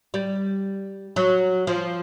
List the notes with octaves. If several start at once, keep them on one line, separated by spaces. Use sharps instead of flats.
G3
F#3
F3